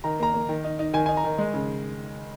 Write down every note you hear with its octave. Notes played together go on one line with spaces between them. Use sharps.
D#3 A#5
A#3 A#5
A#3
D#3
D#4
D#4
D#3 G#5
G#5
D#4
A#5
D#3
G#3
C#3